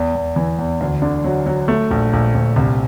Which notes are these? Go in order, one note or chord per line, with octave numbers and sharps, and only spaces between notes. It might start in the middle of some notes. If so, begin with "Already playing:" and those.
Already playing: E2
E2
E3
E2
D2
D3
F#3
F#3
A3
A#1
A#1
A#1
C2